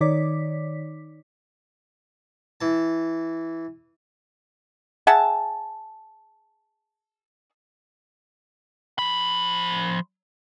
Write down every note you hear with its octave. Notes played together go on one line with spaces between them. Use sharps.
D#3 D#4 C#5 D5 D6 B6
E3 A5
G#4 E5 F#5 A5
F3 B5